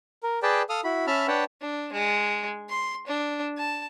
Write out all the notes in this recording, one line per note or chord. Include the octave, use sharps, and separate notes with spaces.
A#4
G#4 B4 D5 G5 A5
A4 F5 D#6 F6
E4 F#4 B5
C#4 E5 A5 B5 F6
D4 B4 C#5 F#5 G5 A5
D4
G#3
C6
D4
A5